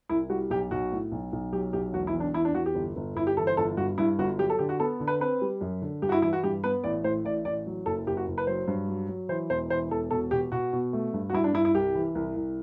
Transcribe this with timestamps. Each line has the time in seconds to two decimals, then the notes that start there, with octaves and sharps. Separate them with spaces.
0.09 C2 E4
0.30 G3 F#4
0.50 B1 G4
0.71 B1 F#4
0.92 A2
1.12 B1
1.33 B1
1.53 F#3 G4
1.73 B1 G4
1.93 E1 F#4
2.07 E4
2.14 E2
2.20 D4
2.34 E2 E4
2.45 D4
2.55 E2 F#4
2.66 G4
2.75 G1
2.96 G1
3.16 G1 E4
3.27 G4
3.37 E3 A4
3.47 C5
3.57 G1 A4
3.77 G2 F#4
3.98 G2 E4
4.19 G1 F#4
4.38 F#3 G4
4.50 A4
4.59 D3 G4
4.69 F#4
4.80 B3 A4
5.00 D3
5.08 B4
5.20 C4 B4
5.41 G3
5.61 F#2
5.82 D3
6.02 G2 G4
6.09 F#4
6.12 E4
6.22 E3 E4
6.33 F#4
6.43 G2 G4
6.64 B3 B4
6.84 A1 D5
7.04 A2 C5
7.24 A1 D5
7.45 A1 D5
7.66 F#3
7.86 F#1 A4
8.07 F#1 G4
8.17 F#4
8.28 F#1
8.38 B4
8.47 F#3 C5
8.68 G2
8.88 F#3
9.08 F#3
9.29 E3 C5
9.50 E1 C5
9.70 E3 C5
9.91 E1 A4
10.11 B2 A4
10.31 B2 G4
10.52 B2 F#4
10.73 B2
10.93 A3
11.13 G2
11.30 F#4
11.33 G2 E4
11.44 D4
11.54 G2 E4
11.65 E4
11.74 C2 G4
11.95 E3
12.15 C2
12.36 C2